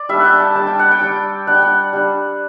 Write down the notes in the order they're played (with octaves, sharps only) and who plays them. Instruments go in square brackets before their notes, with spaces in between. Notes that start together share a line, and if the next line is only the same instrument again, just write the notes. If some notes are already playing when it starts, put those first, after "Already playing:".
Already playing: [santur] D5
G3 D4 E5
F#5 G5
A5
G3 D4 A5
G5
F#5
G5
G3 D4
G3 D4 F#5
G5
F#5
G3 D4